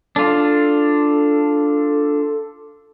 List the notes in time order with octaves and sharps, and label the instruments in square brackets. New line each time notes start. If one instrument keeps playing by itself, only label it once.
[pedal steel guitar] D4 F4 [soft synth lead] A4